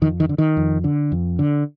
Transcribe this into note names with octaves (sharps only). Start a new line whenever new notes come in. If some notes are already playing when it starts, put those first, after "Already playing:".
F2 D#3
D#3
D3
D#3
F2
D3
F2
D3